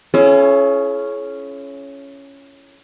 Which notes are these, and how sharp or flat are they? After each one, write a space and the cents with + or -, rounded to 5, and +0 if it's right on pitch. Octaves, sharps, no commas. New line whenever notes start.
C#4 +0 E4 +40 G#4 +45